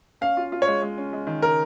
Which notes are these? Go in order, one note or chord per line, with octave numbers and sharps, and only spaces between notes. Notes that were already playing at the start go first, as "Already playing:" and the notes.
C#4 F5
F4
F4
C#5
G#3
G#3
C#4
G#3
D#3
C#3 A#4